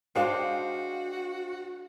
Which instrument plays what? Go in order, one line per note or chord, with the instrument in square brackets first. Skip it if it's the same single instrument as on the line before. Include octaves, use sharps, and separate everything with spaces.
[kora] G#3 D4 [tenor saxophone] F#4 [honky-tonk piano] C5 F5 G5